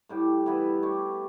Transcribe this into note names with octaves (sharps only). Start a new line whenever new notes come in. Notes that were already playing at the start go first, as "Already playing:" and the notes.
A2 G3 D4 G4
E3 B3 E4 B4
A3 D4 G4 C#5